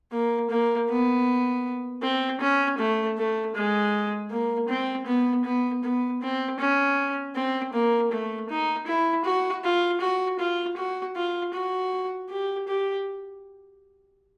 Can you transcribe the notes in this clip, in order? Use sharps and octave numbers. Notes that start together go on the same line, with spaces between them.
A#3
A#3
B3
C4
C#4
A3
A3
G#3
A#3
C4
B3
B3
B3
C4
C#4
C4
A#3
A3
D#4
E4
F#4
F4
F#4
F4
F#4
F4
F#4
G4
G4